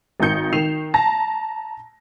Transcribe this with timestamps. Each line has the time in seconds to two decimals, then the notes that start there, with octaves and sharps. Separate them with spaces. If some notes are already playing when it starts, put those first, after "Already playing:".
0.20 G#1 D#3 D#4 G6 C#7
0.53 D#3 C7 E7 F7
0.94 A5 A#5 A#6